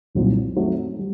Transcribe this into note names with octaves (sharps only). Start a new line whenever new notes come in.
C2 A#2 F#3 C4 D#4
F#2 F#3 A3 C4 D#4
G3